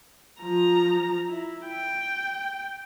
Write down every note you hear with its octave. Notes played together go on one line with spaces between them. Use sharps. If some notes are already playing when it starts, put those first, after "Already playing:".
F3 A#5
E4
G5